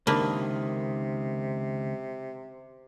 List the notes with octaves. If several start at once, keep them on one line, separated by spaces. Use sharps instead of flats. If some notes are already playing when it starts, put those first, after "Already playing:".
C#2 C3 D#3 A#3 D4 B4